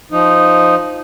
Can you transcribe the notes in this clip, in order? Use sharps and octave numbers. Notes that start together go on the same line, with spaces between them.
F3 D#4